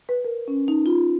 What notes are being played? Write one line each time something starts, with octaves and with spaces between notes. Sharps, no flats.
B4
A#4
C#4
D#4
F4